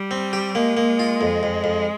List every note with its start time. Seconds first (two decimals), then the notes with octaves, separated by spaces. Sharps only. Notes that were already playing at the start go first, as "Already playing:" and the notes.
Already playing: G3
0.11 C4
0.33 G4
0.55 G#3 A#3
0.77 A#3
0.99 F4
1.21 F2
1.43 F2
1.64 F2